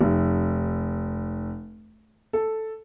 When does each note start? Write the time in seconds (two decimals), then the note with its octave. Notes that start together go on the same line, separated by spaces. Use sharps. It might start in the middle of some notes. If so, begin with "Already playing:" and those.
0.01 F1
2.33 A4